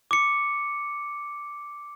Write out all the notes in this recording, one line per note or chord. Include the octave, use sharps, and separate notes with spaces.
D6 C#7